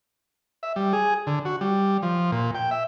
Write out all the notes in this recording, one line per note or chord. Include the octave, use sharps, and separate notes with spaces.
E5
G3
G#4
D3
F#4
G3
F3
A#2
G5
E5